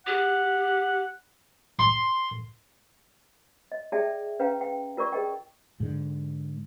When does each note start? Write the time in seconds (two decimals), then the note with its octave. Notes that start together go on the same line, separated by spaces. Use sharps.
0.07 G4 F#5
1.79 C6
3.72 D#5
3.92 G#4 D5 E5 G5 A5
4.39 C#4 B4 F5 G5 A#5
4.61 G5
4.97 F4 A#4 D5 C#6
5.12 G#4 A#4 D#5 G5
5.80 G#2 D3